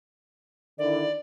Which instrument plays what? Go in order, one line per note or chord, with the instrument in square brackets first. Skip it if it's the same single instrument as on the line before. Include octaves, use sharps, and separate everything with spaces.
[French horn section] D3 D#3 E4 [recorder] D5